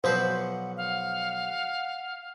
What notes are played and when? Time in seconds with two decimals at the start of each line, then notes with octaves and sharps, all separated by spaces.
0.04 B1 F3 B4 C5 F#5
0.77 F5 F#5